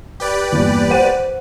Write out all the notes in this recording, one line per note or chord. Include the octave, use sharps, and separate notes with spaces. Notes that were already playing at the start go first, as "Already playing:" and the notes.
G4 B4 D5
E2 G2 A#2
C5 F#5 D#7